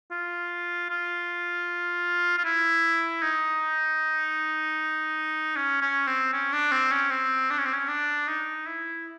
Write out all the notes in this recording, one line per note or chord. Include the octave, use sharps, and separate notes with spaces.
F4
F4
F4
E4
D#4
C#4
C#4
C4
C#4
D4
C4
C#4
C4
D4
C#4
C4
C#4
D4
D#4
E4